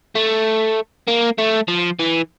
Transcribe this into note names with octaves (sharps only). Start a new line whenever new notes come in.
A3
A#3
A3
F3
E3